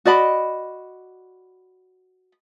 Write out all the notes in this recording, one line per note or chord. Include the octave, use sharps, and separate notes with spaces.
F#4 D5 D#5 B5